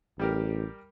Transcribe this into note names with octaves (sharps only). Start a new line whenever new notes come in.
A1 G3 G4 A#4